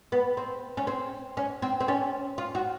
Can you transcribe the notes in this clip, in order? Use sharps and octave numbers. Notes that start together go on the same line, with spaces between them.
B3
C4
C#4
C4
C#4
C4
C4
C#4
F4
F#4